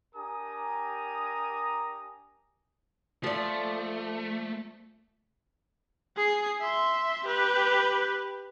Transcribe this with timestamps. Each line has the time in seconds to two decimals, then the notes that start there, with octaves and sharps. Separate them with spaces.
0.15 D4 G4 A#4 G#5 A#5 D#6
3.24 F3 A3 D5
6.17 G#4 C7
6.61 E5 C6
7.24 G4 B4